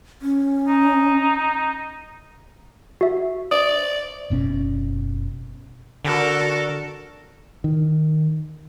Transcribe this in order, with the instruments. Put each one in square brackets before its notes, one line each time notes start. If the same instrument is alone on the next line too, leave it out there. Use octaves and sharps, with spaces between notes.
[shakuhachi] C#4
[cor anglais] D#4
[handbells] F#4 E5
[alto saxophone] D5 [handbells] D#6
[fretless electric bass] F#1 B2 C#4
[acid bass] D3 [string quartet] F#4 A4 A#4
[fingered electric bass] D#3